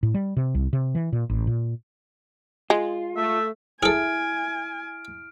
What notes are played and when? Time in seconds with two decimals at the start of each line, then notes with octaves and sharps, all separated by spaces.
0.03 A2
0.14 G3
0.37 C3
0.55 C2
0.73 C3
0.95 E3
1.12 A#2
1.30 A1
1.47 A#2
2.70 G#3 F4
3.16 A3 E5
3.83 E4 G#4 A4 G#5 F6 D7